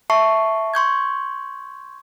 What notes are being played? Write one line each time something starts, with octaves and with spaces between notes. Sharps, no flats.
E5 A5 C#6 C7
C6 C#6 G6 G#6